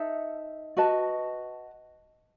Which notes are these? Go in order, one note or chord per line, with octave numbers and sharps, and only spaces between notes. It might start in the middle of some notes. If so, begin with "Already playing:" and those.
Already playing: D#4 A4 E5
F#4 B4 D#5 A5